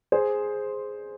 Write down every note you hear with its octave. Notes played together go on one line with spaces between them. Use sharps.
G#4 C5